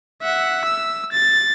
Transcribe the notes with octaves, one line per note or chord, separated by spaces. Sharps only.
E5 F#5
E6
A6